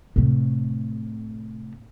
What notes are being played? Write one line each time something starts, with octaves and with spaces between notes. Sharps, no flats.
A2 C3